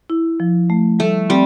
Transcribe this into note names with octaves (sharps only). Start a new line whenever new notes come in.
E4
F3
A3
G3 A3
G3 C4